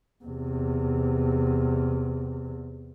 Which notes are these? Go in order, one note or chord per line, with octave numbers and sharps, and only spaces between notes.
E2 C3